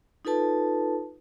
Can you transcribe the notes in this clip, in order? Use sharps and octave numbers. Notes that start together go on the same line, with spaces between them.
D#4 F4 A4 B4 A5